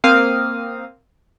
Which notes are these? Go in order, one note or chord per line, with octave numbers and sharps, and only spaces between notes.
A#3 C4 F5 D#6